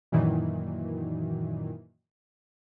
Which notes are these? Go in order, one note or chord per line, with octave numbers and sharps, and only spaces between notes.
F#2 A#2 D#3 E3 F#3